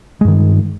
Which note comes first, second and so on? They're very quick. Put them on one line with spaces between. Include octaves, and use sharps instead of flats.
G#3 G2 D#3